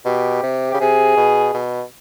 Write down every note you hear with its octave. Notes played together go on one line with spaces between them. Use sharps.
B2 G4
C3
C#3 G4
C3 G#4
B2
B2